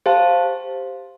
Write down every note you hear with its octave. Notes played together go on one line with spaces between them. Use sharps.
G4 C5 F5 A5